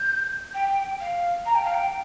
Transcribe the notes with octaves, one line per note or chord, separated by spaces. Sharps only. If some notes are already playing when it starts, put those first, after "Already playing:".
Already playing: G6
G5
F5
A#5
G5
F5
G5